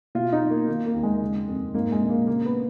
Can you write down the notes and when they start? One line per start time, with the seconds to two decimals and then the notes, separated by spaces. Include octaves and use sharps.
0.15 B2 F4
0.33 D#4
0.41 B1
0.50 A#3
0.68 D#3 A#3
0.86 A#3
0.94 D#2
1.03 G#3
1.21 C#3
1.48 F2
1.74 G#2 A#3
1.92 G#3
2.01 A#1
2.10 A#3
2.27 C#3 A#3
2.46 B3